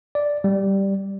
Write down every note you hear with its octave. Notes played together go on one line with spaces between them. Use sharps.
D5
G3